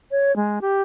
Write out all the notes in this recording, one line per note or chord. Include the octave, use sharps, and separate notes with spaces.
C#5
G#3
G4